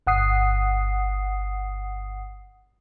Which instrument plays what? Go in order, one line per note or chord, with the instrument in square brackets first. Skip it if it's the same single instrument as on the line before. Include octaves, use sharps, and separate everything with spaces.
[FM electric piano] G1 F#5 D#6 C7